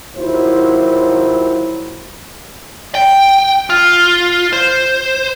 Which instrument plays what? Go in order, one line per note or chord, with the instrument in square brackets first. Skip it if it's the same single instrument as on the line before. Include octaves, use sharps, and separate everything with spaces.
[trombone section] D#2 F#3 E4 F4 C5
[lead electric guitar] G5
F4
C5